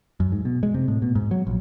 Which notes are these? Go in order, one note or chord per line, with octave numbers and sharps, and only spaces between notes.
F#2
G#2
B2
G#3
C3
A2
B2
G#2
F#3
A#1